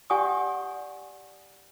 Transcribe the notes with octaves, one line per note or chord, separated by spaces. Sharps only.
G4 D5 F#5 G#5 C#6 D#6